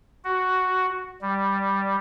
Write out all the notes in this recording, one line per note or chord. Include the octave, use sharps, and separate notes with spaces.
F#4
G3